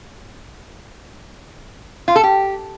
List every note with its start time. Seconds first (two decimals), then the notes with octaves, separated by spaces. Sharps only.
2.08 F4
2.16 A4
2.23 G4